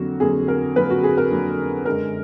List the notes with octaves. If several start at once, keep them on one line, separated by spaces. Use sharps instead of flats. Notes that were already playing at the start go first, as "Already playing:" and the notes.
Already playing: F2 D3 F#3 A#3 F#4
F2 D3 F#3 A#3 G#4
A#4
F2 D3 F#3 A#3 B4
F#4
G#4
A#4
F2 D3 F#3 A#3
F#2 D3 G#3 A#4